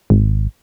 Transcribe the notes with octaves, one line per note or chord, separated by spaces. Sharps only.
G#1